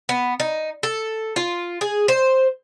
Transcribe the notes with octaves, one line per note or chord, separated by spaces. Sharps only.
B3
D#4
A4
F4
G#4
C5